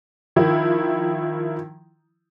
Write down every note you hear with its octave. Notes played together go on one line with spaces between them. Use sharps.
D#3 F3 E4